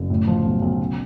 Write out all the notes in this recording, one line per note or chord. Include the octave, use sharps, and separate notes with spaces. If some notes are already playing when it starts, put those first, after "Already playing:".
Already playing: F#1
A2
F3
B1
B1
C#3